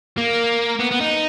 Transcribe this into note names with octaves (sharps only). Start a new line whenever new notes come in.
A#3
B3
B3
D#4